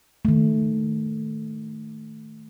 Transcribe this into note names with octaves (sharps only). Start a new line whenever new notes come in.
D#3 A3